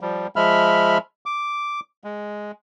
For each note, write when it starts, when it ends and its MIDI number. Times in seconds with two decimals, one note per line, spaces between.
0.01 0.27 53
0.01 0.27 55
0.36 0.98 53
0.36 0.98 56
0.36 0.98 76
0.36 0.98 83
0.36 0.98 89
1.26 1.80 86
2.04 2.51 56